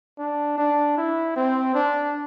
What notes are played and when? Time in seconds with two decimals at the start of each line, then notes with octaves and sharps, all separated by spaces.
0.18 D4
0.58 D4
0.98 E4
1.36 C4
1.74 D4